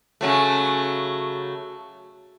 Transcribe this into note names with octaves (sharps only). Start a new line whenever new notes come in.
C#3 F#3 A3